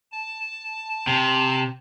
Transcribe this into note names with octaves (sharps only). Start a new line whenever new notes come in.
A5
C3